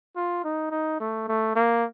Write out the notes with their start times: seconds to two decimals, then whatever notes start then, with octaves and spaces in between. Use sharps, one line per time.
0.16 F4
0.44 D#4
0.71 D#4
1.00 A3
1.28 A3
1.56 A#3